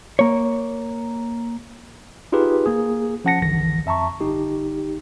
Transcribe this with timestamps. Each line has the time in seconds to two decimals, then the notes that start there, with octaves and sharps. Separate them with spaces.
0.19 A#3 C#5
2.32 D#4 F4 G4 G#4 B4
2.66 A#3 G#4
3.24 F3 C#4 F#5 A5 A#6 C#7
3.42 G1 C2 D#3 E3 A#6
3.86 F2 E5 A5 A#5 C#6
4.21 G1 D#4 G4